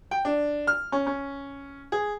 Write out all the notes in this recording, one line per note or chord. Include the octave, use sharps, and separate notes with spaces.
G5
D4
F6
C#4
C#4
G#4